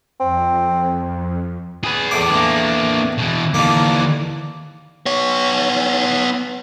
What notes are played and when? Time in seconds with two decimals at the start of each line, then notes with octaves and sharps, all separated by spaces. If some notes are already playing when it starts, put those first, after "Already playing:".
0.20 F2 C4
1.84 G#4 B4
2.11 E2 A2 D6
2.32 A#3 D4
3.18 B2 E3
3.54 D#2 D3 E3 A#3
5.06 B3 C#5